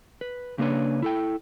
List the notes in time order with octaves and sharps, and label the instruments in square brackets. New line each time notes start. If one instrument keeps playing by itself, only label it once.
[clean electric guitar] B4
C#3 A#3 D4 B4 C#5
E4 A4 G5